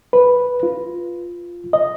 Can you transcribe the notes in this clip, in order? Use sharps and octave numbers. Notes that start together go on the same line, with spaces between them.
B4
F4
D#5